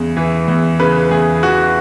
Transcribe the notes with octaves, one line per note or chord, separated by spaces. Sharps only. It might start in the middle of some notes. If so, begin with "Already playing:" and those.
Already playing: E2 C#3
E3
E2
C#3 B4
E2 G#4
E3 F#4